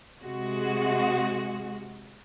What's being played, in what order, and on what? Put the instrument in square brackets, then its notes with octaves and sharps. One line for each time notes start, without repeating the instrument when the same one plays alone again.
[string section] C3 G#3 F#4